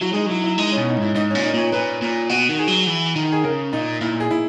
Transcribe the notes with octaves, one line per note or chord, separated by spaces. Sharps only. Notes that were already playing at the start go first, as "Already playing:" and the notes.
F#3 E4
G#3 D#4
F#3 E4
E4
G#3 D#4
C#4
B2
D#4
G#2 E4
G#2 D#4
C#4
A#2
D#4
A#2 C#5
A#2 B4
A#2
B2 F#4
D#3
G#4
F#3
E3
D#3
G#4
C#3 A#4
A#2 D#4
A#2 E4
G#4
E4